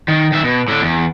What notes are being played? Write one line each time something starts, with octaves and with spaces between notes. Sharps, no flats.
D#3
D#3 E5
B2
A2 D3
E2